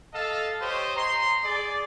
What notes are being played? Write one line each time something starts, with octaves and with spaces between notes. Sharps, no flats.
A4 D#5 F5 A5
G4 C5 C#5 D#5
A#5 C6
G#4 D5